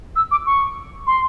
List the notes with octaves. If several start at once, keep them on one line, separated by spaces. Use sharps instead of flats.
E6
D6
C#6
C6